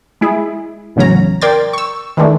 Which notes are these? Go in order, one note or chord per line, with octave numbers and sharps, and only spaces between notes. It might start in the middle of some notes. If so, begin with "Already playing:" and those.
G#3 E4 G#4
A1 E2 C#3 F#3 C#4 A#5
A#4 D5 G5 C6 G#6 A6
C#6 E6
D#3 E3 G#3 A3 D4